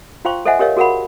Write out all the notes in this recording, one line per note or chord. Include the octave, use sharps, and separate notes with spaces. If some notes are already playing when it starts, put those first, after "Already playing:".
F4 C5 F5 G5 C6 C#6
A4 C5 D#5 E5 F#5 G#5
G4 A#4 C#5 D#5 F5
F#4 G#4 A#4 F5 F#5 B5